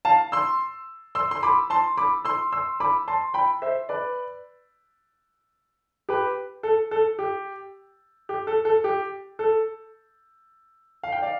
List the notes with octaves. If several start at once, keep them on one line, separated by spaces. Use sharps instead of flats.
F5 A5
C6 E6
C6 E6
C6
B5 D6
A5 C6
B5 D6
C6 E6
C6 E6
B5 D6
A5 C6
G5 B5
C5 E5
B4 D5
G4 B4
A4
A4
G4
G4
A4
A4
G4
A4
F5
G5
D5 F5